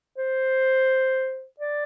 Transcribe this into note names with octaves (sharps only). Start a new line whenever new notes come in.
C5
D5